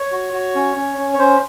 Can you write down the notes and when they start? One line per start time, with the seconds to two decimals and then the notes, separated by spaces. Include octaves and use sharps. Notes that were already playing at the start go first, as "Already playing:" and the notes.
Already playing: C#5
0.12 F#4
0.33 F#4
0.55 C#4
0.76 C#4
0.98 C#4
1.14 C#5
1.19 C#4 C5